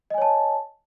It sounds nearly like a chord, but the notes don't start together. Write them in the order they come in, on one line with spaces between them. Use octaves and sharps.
D#5 G#5 C#5 A5